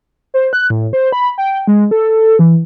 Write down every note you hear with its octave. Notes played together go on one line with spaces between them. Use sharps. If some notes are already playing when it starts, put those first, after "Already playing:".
C5
F#6
A2
C5
B5
G5
G#3
A4
E3